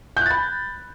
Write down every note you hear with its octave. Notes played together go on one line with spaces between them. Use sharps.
B5 F#6 G6 A6